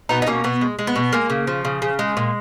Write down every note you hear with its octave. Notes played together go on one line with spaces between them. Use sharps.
B2 B3 D#4
D#4
B2 A#3 C#4
B2 B3
G#3
G#3
B3
B2
G#3 A#3
C#3
F3
C#3
C#3
G#3
A#2